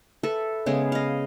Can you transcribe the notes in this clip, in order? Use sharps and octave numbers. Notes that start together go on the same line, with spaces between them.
A4 B4 E5
C#3 G#3 B3 G#4
D#5 F5